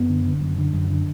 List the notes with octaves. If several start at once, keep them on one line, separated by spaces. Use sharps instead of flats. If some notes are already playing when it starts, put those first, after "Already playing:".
Already playing: F#2 B3
D3
D3
F#2
D3
F#2
D3